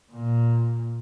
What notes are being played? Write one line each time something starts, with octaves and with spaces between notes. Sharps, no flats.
A#2